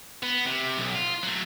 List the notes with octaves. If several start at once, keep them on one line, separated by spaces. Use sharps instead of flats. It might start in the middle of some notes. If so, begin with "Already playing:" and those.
B3
C3
B1
F4
F#3 A3